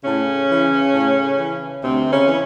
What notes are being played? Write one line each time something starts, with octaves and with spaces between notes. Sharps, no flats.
A2 C#3 C#4
E3
A2
E3
D2 C3 C4
C#3 C#4
C#3 E3